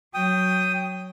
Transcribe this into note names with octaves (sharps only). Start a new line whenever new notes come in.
F#3 G5 D#6